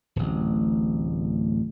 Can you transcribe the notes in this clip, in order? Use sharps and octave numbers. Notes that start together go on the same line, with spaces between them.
D1 A1